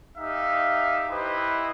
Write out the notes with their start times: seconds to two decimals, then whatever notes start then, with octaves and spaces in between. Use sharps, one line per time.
0.18 D#4 G4 E5 F5
1.10 E4 G4 B4 C5 D#5